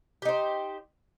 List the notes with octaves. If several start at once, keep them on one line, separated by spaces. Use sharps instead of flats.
D#4 G4 C5